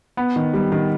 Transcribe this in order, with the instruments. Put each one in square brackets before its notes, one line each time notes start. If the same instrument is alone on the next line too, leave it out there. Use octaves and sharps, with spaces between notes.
[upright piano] B3
D#3
G3
D#3